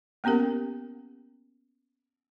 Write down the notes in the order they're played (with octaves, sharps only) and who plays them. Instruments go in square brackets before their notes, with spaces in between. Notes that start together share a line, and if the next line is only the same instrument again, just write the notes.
[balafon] A#3 B3 C#4 G4 A#4